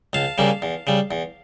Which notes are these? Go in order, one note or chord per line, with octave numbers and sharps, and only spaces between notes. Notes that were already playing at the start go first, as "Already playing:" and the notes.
C#2 F5 A5
C#3 G3 A#3 C#4
E2
C#3 G3
E2